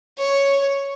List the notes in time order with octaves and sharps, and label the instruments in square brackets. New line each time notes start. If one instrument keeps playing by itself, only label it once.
[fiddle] C#5